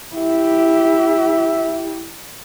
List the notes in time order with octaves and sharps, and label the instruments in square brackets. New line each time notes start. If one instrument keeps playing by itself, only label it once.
[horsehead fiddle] E4 G4 [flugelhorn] E5